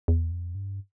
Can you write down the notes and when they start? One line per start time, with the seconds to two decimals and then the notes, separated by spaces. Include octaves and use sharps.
0.08 E2
0.31 F2
0.55 G2